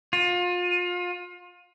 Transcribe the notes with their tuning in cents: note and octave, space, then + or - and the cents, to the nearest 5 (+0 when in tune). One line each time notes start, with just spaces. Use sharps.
F4 +30